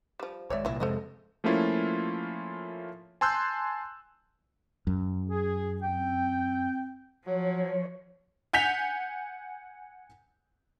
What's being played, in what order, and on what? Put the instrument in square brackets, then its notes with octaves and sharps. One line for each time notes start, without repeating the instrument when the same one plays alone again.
[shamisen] F3 G3
[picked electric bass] G#1 G#2 [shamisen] C#5 D5 E5
[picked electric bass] C2 A#2 [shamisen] E3 E4
[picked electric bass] F2 C3 G#3 [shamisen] A4 C5 D#5
[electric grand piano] F3 A3 A#3 C#4 E4 F4
G#5 A5 C6 E6 F#6 G6
[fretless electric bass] F#2
[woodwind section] G#4
C4 G5
[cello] F3 [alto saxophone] F#3 [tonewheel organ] C#5
[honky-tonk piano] F#5 G#5 G6 B6 F7